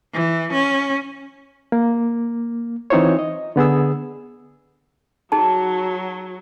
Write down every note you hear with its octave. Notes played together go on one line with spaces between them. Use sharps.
E3
C#4
A#3
E3 C4 D#4 F4 C5 C#5
D#5
D3 B3 G#4 E6
F#3 D#4 G#4 A5